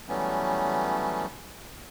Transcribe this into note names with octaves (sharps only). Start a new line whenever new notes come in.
E3 F#3 G3 A3 B3 C#4